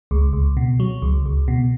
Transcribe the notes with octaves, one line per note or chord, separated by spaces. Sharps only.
C#2
C#2
B2
F#3
C#2
C#2
B2